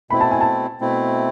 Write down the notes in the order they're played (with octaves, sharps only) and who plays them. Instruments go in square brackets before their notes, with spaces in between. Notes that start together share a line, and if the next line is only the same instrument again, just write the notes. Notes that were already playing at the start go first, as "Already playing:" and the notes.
[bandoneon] B2 A3 C4 E4 [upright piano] B5
[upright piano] A5
G#5
A5
[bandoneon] B2 A3 C4 E4